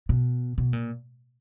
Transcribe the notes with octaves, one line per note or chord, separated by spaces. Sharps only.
B2
B2
A#2